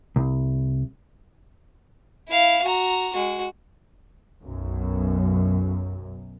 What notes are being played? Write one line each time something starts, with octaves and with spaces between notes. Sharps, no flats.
C2
E4 F5
F#4 A#5
G#3 F#4
B1 F#2